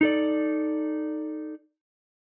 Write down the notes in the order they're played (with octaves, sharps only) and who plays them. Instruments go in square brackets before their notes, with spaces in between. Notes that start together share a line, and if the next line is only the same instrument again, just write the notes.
[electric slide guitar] D#4 A4 D5